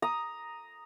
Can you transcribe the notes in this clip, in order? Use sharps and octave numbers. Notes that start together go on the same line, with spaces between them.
A#5 D#6